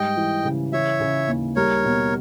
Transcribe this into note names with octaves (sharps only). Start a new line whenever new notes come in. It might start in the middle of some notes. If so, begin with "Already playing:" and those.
Already playing: G#2 G3 D#5 G5
E3
C#3
E3 C#5 E5
C#3
D#2
G3 A#4 C#5
B2